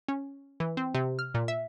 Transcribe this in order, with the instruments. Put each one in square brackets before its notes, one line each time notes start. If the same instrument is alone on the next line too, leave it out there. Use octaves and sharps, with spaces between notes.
[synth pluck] C#4
E3
C4
C3
F6
A#2
E5